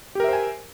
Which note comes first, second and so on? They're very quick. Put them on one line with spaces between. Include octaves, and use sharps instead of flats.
G4 A#4 E5 C5 G#5